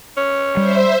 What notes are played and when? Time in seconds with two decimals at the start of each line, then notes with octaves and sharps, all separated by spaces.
0.17 C#4
0.57 G3 C5 E5